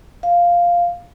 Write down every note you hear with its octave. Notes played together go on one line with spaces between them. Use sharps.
F5